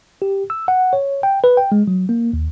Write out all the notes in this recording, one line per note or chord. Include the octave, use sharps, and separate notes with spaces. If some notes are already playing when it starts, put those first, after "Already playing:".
G4
E6
F#5
C#5
G5
B4
G5
G#3
F#3
A#3
D#2